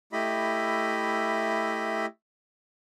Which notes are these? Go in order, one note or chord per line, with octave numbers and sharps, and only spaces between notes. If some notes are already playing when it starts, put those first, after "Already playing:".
A3 E4 G4 D#5 B5